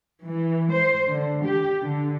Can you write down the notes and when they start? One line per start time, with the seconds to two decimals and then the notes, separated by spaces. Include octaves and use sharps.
0.22 E3
0.73 C5
1.09 D3
1.45 G4
1.82 D3